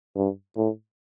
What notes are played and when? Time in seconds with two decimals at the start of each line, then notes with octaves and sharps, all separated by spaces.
0.16 G2
0.57 A2